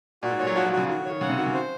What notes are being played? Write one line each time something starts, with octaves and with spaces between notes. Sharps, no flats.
A#2 F#4
G#2
A#2 C#5
F#3
F3 F#4
F3
C#3 F#4
D#3 F#4
D#3
C#5
D#3
C#3 F#5
C3
D#3 F#4
C#3
C5